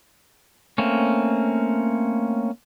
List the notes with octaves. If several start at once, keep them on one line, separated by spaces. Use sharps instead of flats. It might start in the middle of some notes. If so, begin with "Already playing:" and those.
A3 A#3 C4 C#4